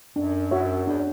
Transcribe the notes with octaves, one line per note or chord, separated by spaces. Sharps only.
F#2 D4
F#2 F#4 C#5 E5
E2 D4